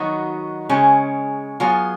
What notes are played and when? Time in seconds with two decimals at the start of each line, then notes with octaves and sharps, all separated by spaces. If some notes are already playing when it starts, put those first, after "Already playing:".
Already playing: D#3 F#3 B3 D#4 F#4
0.69 C#3 G#3 C#4
1.60 F#3 B3 F4 G#4